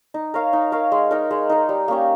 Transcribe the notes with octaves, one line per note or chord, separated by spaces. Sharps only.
D#4
A#4 C#5 F5
D#4
A#4 C#5 F5
G#3
D#4 A#4
G#3
D#4 A#4
G3
A#3 C#4 G4